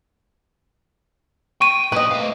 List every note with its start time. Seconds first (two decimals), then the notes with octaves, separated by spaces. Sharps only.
1.61 G5 C#6 D#7
1.92 A#2 B4 C5 D#5
2.11 A3 F5